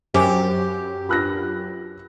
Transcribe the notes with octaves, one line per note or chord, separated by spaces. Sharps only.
F#2 G4 A#4 C5 G#5 D6
F4 A#4 B4 B5 F#6 A#6